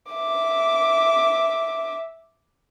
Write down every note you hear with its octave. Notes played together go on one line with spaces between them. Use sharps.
E5 D6